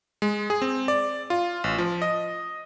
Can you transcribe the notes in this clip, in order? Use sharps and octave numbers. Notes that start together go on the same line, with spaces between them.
G#3
G#4
C4
D5
F4
A1
F3
D#5